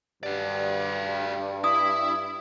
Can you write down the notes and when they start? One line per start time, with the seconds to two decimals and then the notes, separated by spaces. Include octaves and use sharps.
0.23 G2 F#4 D5
1.64 E4 D#6